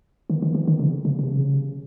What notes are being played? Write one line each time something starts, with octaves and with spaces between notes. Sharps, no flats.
D#3
D#3
E3
D#3
C#3
C#3
C3
C#3